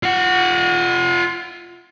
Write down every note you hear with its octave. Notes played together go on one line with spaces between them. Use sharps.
F4 F#5